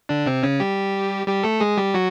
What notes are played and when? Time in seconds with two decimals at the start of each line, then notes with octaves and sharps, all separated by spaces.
0.09 D3 D4
0.26 C3 C4
0.43 C#3 C#4
0.60 G3 G4
1.27 G3 G4
1.43 A3 A4
1.60 G#3 G#4
1.78 G3 G4
1.94 F#3 F#4